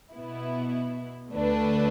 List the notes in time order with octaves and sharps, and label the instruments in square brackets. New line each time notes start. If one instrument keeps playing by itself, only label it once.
[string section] B2 B3 E4
D2 D3 A3 D4 B4